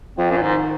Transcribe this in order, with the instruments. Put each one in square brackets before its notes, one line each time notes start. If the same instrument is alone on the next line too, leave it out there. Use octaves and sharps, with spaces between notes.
[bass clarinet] F2 [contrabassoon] F3
[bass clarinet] F#2
A#2
[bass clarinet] G#2 [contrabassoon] D#3